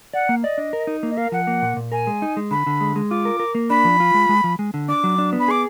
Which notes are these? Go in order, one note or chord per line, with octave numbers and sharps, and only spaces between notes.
D5 F#5
A#3
D5 D#5
D4
A#4
D#4
A#3
D#5
A#4 F5
F3 F#5
A#3
A#2
A#2
A#4 G#5
G#3
D#4
G#3
D3 B5
D3
G#3
G#3
F4 D6
A#4
A#4
A#3
D4 B5
F3
F4
G#3
G#3
F3
G#3
D3
D4 D6
F#3
D4
B3
B5
G#4 D6